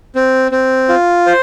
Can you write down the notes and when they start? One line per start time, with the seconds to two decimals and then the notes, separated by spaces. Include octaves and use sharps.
0.15 C4
0.52 C4
0.89 F4
1.26 C5